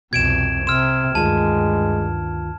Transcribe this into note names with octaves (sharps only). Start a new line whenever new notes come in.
C2 F2 B2 G#6 D7 E7
C3 C6 E6 F6 E7
D2 G2 D#3 G#3 F4 A5